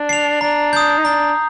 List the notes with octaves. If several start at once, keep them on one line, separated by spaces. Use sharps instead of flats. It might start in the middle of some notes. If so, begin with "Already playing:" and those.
Already playing: D4
C7 F7
D4 A#5
D#6 G6
D#4
D4 A#5